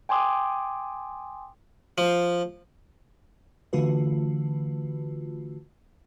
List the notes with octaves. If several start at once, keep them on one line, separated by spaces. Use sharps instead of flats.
G5 G#5 C6 D6 D#6
F3
D3 E3 A3 F4 F#4 B4